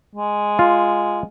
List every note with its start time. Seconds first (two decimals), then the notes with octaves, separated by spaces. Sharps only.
0.15 G#3
0.59 F4